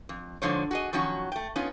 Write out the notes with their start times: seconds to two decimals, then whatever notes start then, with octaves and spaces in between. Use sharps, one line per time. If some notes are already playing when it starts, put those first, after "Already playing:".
0.09 F2
0.42 G#2 D3 F3 C5 C#5
0.71 F#4 G#4 D#5
0.93 D#3 F3 F#3 C#4 F#4
1.32 A3 G5
1.56 B3 C#4 D#4 F4